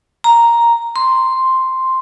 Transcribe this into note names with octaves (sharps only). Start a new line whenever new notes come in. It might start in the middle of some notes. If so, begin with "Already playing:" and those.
A#5
C6